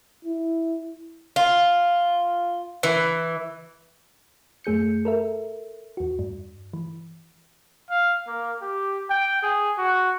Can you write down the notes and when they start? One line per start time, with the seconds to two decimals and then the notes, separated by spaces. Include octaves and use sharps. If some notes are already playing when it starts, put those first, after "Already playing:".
0.25 E4
1.36 F4
2.83 E3
4.64 F#2 A3 G#4 G6 C#7
5.05 A4 A#4 E5
5.97 E2 F#4
6.19 G2
6.73 E3
7.90 F5
8.28 A#3
8.62 G4
9.10 G5
9.43 G#4
9.78 F#4